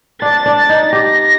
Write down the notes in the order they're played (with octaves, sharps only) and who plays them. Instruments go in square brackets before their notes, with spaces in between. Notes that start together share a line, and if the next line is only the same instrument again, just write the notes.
[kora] D4 [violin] A6
[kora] D4
D#4
[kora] G4 [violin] A#6